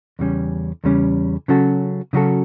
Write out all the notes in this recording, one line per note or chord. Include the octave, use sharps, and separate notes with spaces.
E2 C#3 G3 C#4
E2 C#3 G3 C#4
C#3 F#3 C#4 F#4 A4
C#3 F#3 C#4 F#4 A4